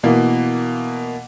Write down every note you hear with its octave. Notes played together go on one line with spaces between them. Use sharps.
B2 E3 A#3